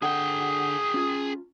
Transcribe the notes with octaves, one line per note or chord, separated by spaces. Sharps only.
D3 G#4 F#5 G5 D#6
C#4 F4